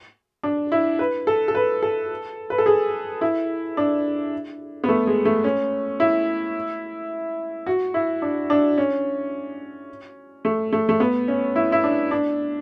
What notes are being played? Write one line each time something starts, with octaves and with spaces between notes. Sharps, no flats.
D4
E4
B4
A4
A4
B4
A4
B4
A4
G#4
E4
D4
B3
A3
G#3
A3
C#4
E4
F#4
E4
D4
D4
C#4
A3
A3
A3
B3
C#4
E4
E4
D4
D4